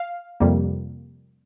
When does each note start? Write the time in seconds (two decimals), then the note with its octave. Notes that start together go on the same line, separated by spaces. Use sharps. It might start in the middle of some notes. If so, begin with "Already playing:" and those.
Already playing: F5
0.40 F2 C3 G3 A#3